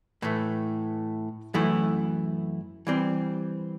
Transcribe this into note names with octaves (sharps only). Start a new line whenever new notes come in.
A2 E3 A3
F#2 E3 A3 E4
E3 G3 C4